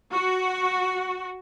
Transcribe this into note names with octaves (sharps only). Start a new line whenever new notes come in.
F#4